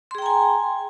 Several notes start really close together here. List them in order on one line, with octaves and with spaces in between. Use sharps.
C6 G#4 G5 A#5 G#5